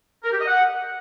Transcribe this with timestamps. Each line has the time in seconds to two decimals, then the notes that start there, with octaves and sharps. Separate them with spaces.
0.24 A#4
0.32 G4
0.40 D#5
0.48 F#5